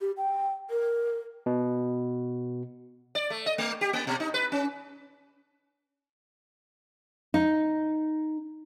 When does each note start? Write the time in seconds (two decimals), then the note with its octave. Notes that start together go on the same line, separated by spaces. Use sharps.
0.01 G4
0.17 G5
0.70 A#4
1.46 B2
3.15 D5
3.30 A3
3.46 D#5
3.58 A3
3.81 G4
3.93 A#3
4.07 B2
4.20 D#4
4.34 B4
4.52 C#4
7.34 D#4